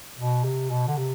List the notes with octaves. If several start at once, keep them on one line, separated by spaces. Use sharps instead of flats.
B2
C3
B2
D3
C3